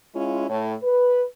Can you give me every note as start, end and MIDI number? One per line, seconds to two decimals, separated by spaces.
0.15 0.47 56
0.15 0.47 61
0.15 0.47 64
0.15 0.47 65
0.48 0.74 45
0.48 0.74 73
0.83 1.25 71